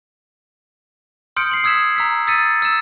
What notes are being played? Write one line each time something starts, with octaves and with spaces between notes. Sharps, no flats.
C6 D#6 F6 G6 C#7 D7
C7 F#7
D#6 E6 G#6 B6 E7
A#5 E6 B6
D#6 E6 A6 B6 C#7 D#7
E6 E7